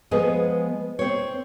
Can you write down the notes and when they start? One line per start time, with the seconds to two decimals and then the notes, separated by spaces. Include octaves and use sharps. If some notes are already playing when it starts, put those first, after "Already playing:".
0.11 F3 G#3 B3 G#4 B4 D#5
0.99 C4 C#5